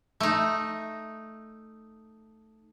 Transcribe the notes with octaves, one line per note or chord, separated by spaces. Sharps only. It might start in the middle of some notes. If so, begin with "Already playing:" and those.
A3 D#4